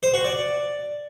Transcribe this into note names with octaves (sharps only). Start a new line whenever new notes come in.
C5
F#4
D5